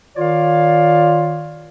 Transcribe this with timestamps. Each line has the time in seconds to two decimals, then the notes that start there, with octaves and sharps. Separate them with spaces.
0.17 D#3 F4 C#5 D5 F5